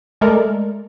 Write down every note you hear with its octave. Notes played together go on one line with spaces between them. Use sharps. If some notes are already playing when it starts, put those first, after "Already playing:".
G#3 A3 A4 A#4 D5